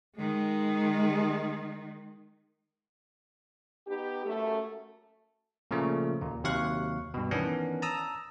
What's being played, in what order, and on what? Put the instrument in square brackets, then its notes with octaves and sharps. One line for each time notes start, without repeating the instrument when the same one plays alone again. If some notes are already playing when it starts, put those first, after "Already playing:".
[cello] D#3 G#3
[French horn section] B3 D#4 G4
F#2 A3
[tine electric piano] A#2 C#3 F3 A3
D#2 A#2
D#2 C3 F#3 F5 C#6 F#6
G2 B2
D#3 E3 B3 C#4 D4
A5 A#5 D#6 E6